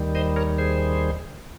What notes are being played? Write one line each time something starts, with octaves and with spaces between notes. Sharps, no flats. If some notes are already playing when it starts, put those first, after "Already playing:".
Already playing: D#2 D#3 G3
C5 D#5
A#4 C#5
G#4 C5